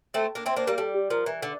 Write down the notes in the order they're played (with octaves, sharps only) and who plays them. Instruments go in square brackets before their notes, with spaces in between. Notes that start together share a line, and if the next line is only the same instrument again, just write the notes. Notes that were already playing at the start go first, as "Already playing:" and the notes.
[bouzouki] A3 C4 [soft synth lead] A4
[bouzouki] A#3 D4
[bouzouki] C4 E4 [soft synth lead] C5
[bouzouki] A#3 D4 [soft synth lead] C5
[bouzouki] G3 A#3 [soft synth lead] A#4
[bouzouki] G3 [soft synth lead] A4
[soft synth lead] G4
[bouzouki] F3 [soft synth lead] A#4
[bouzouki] E3
D3